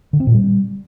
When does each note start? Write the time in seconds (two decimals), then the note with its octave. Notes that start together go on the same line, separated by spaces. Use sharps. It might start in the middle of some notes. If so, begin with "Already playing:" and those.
0.13 D3
0.20 C4
0.27 A#2
0.34 G3